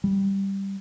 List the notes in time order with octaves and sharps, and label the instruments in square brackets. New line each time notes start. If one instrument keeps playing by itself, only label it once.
[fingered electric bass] G3